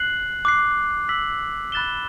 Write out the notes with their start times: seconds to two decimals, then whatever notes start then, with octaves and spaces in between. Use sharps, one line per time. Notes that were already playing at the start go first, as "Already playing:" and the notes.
Already playing: F#6 C7 F#7
0.45 D6 F#6 C7
1.09 E6 B6 F#7
1.72 B5 F#6 A6 E7 G7